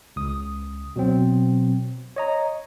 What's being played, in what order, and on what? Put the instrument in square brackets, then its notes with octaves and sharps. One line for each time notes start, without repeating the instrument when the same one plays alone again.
[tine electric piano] C#2 D#6
B2 F#3 C4
C#5 D#5 A#5